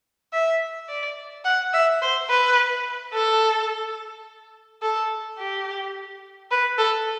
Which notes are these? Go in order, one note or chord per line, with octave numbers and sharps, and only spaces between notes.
E5
D5
F#5
E5
C5
B4
A4
A4
G4
B4
A4